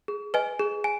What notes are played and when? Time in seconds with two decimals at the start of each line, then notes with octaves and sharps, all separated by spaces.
0.08 G#4
0.34 B4 D#5 G#5
0.59 G#4
0.84 G#5